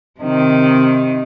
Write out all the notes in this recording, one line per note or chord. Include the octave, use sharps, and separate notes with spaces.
C3 D#3